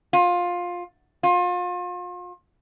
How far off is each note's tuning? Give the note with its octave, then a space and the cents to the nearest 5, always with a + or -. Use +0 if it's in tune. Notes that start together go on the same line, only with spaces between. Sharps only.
F4 +15
F4 +35